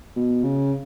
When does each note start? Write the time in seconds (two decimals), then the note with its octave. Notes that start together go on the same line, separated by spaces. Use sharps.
0.16 B2
0.44 C#3